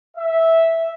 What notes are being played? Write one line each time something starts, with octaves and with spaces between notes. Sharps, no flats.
E5